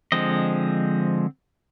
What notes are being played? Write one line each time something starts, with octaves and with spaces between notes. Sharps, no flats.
D3 F3 G#3 C4 D#5